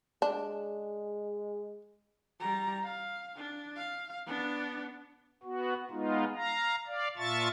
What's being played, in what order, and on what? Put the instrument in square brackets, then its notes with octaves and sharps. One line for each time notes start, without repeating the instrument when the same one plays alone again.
[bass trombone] G#3 [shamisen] D4
[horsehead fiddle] G3 A#5
F5
D4
F5
B3 D4
[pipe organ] B3 F#4
G#3 B3 D#4 F4
F5 A#5
D5 F5
A#2 F4 E5 A5 C#6 A6